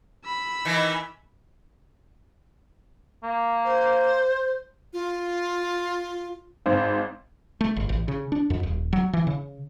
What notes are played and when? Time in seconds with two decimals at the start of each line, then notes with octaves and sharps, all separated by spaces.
0.25 B5 E6
0.65 D#3 E3
3.23 A#3
3.65 C5
4.93 F4
6.66 G#1 G#2 C5
7.61 A3
7.77 G1
7.89 A1
8.08 C#3
8.32 D4
8.50 F2
8.63 D#1
8.93 F#3
9.13 E3
9.27 C#3